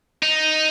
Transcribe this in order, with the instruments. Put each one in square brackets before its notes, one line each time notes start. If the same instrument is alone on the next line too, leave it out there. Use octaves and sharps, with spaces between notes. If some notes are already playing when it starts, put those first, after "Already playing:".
[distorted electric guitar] D#4